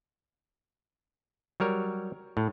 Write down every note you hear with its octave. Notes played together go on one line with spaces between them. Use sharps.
F#3 G3 A#4 C#5
A2